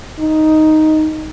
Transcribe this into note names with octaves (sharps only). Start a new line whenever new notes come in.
D#4